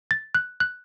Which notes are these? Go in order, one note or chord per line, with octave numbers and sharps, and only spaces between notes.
A6
F#6
F#6